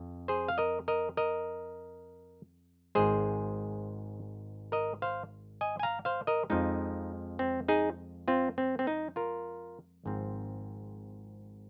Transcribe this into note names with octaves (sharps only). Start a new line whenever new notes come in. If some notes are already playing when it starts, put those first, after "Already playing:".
Already playing: F2
G#4 C5
F5
A#4 D#5
A#4 D#5
A#4 D#5
G#1 G#2 G#3 G#4 C5
A#4 D#5
C5 F5
D#5 G#5
G#5
F5 A#5
C5 F5
A#4 D#5
F2 F3 G#3 D#4
C4
D#4 G#4
C4 F4
C4
C4
D#4
F4 A#4
G#1 G#2 F3 C4